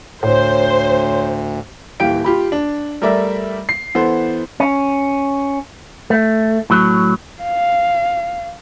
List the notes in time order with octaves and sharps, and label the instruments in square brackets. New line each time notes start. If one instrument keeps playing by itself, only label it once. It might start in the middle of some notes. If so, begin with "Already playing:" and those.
[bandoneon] D2 [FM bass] A2 [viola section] C5 [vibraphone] C#5
[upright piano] D#1 E3 G4 F5 G5 D7
F4 G4 B5
D4
G3 A3 A#4 D5 E5
C7
E3 B3 A4 C5
[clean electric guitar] C#4
A3
A2 F#3
[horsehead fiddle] F5